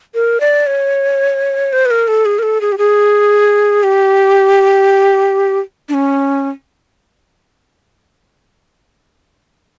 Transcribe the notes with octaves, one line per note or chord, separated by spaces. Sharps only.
A#4
D5
C#5
C5
B4
A#4
A4
G#4
A#4
A4
G#4
G4
G#4
G4
D4
C#4